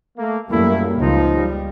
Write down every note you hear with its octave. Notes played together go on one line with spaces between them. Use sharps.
A3 A#3
F#2 G3 A3 A#3 E4
C#2 F3 D#4
G3